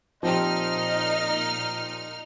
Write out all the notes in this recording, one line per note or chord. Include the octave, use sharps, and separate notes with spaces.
A#2 F3 C4 D#4 G4 D#5 F6